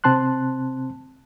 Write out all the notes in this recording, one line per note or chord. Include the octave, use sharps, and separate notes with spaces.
C3 C4 A5 C6 F#6